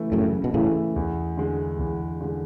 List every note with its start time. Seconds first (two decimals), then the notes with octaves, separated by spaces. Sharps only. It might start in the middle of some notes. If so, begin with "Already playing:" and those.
Already playing: C#3 E3 A3 E4
0.12 F#2 A2 C#3
0.44 B2
0.54 A2 C#3 E3 A3 E4
0.96 E2
1.37 D3 G#3
1.79 E2
2.21 D3 G#3